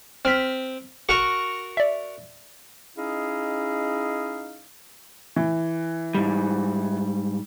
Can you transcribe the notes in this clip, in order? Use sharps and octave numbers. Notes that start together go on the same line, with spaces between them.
C4 F6 B6
F#4 A#4 C#6
D5 E5
C#4 D#4 E4 G#4 D#5 F5
E3
G#2 G3